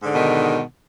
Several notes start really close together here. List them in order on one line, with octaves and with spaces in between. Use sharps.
G#2 D3 B2 D#3